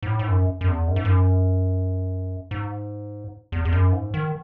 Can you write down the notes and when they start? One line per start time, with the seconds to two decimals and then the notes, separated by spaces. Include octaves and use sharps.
0.03 G#2
0.07 A2
0.19 G#2
0.28 F#2
0.61 F#2
0.68 E2
0.88 F#2
0.96 G#2
1.05 F#2
2.51 G#2
3.52 E2
3.65 E2
3.72 F#2
3.92 G#2
4.14 D#3